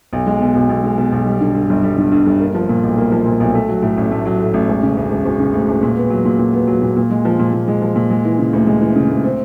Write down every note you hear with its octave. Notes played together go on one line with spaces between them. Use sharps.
B1
G#3
B2
B1
B1
G#3
B2
B1
G3
D3
G2
G1
G3
D3
G2
G1
A#3
F3
A#2
B1
A#3
F3
A#2
B1
A3
F#3
A2
A1
A3
F#3
A2
A1
E1
C#3
D2
E1
E1
C#3
D2
E1
A#2
B3
F#3
A#2
A#2
B3
F#3
A#2
A#2
G#3
F3
A#2
A#2
G#3
F3
A#2
G#3
E3
C#3
D2
G#3
E3
C#3
D2
C4